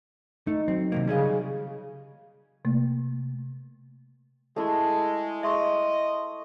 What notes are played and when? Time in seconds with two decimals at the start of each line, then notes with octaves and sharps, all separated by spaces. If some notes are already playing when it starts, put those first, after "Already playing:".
0.47 A3 D#4
0.68 F#3 C4
0.92 C3 D#3 A#3
1.07 C#3 G3 G#4 D#5
2.65 C3 A3 A#3
4.56 G#3 A3 E4
5.43 D#5 E5 C6 C#6